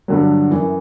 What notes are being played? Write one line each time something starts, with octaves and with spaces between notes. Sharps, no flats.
G2 D3 F#3
F#2 E3